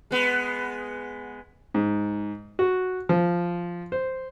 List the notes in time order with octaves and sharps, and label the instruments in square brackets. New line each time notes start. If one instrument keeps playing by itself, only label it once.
[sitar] G#3 B3
[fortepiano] G#2
F#4
F3
C5